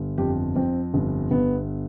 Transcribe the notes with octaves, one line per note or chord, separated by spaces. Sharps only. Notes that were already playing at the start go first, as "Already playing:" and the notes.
Already playing: G1
F2 G4
F2 C4
G1
G1 B3